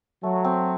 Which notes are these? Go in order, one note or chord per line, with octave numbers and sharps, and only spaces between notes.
F#3 A3
C4